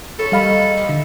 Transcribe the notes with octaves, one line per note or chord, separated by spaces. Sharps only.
F4 A4 B4 C#5
D#3 G3 A#3 D#4 F5 B5
G#3
F3 A#3 G4
D3 E5